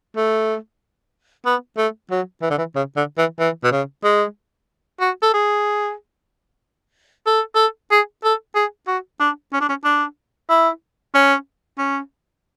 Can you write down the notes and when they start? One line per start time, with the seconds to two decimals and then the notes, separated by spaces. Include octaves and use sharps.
0.16 A3
1.45 B3
1.77 A3
2.11 F#3
2.42 E3
2.50 D3
2.58 E3
2.75 C#3
2.96 D3
3.18 E3
3.39 E3
3.64 B2
3.72 C#3
4.04 G#3
5.00 F#4
5.22 A4
5.33 G#4
7.26 A4
7.55 A4
7.91 G#4
8.24 A4
8.55 G#4
8.87 F#4
9.20 D4
9.53 C#4
9.61 D4
9.69 C#4
9.84 D4
10.49 E4
11.14 C#4
11.78 C#4